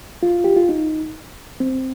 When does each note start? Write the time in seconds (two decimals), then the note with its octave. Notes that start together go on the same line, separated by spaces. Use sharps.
0.23 F4
0.44 G4
0.56 F4
0.69 D#4
1.60 C4